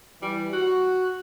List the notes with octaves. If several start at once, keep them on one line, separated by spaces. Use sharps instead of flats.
E3 G3
F#4